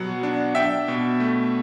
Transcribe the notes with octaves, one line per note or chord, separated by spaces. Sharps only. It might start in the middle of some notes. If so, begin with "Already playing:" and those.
Already playing: B2 F#3 B3 F#5
D4
D4 E5 G5
B2
A3